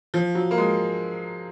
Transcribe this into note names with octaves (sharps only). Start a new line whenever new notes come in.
F3
F#3
A#3
G#3